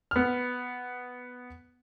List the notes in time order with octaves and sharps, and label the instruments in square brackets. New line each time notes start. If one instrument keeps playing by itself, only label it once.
[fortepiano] B3 F6